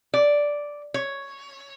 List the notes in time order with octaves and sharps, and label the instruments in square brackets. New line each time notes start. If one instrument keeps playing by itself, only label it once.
[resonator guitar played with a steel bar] D5
C#5